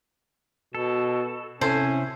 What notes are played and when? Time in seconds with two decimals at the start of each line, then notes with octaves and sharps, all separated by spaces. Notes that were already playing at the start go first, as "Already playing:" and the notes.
0.75 B2 A4
1.61 C3 C#4 E4 A4 C5